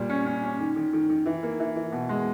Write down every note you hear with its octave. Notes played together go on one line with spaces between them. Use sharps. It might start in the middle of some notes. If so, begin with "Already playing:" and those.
Already playing: A#2 G3
C#4
C#4
C#4
D#3
D#3
D#3
D#3
E3
A#3
E3
E3
B2
G#3